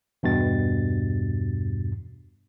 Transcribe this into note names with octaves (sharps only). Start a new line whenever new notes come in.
E2 G2 B2 A6